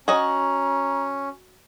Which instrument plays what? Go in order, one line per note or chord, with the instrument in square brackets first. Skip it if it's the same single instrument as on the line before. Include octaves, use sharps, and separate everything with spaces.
[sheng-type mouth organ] C#4 [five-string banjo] F#4 C#5 D#5 [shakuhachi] A#5